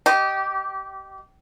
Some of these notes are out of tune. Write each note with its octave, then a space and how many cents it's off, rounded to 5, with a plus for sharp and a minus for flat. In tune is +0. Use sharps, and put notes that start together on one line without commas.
G4 -20 D#5 -10